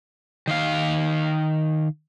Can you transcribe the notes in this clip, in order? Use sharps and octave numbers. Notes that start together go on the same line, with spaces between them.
D#3 F5